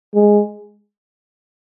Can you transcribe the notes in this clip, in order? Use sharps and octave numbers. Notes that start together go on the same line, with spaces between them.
G#3